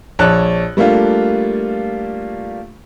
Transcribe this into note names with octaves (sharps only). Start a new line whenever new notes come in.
A#1 C#5 D5 A5 F#6
G3 A3 A#3 D4 F4